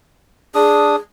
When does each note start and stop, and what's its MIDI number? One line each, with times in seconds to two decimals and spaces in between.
0.55 0.96 62
0.55 0.94 68
0.55 0.96 87